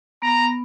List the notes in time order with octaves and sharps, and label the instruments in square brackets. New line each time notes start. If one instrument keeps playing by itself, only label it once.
[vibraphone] B3 [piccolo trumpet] A#5